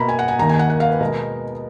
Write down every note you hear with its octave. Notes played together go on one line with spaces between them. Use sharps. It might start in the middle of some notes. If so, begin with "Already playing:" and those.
Already playing: B2 A#3 A#5 B5
G#5
F#5
G#5
D#2 D#3 A#3 A#5
G#5
F#5
F#5
F5
B4
B2 G#3 B3 A#4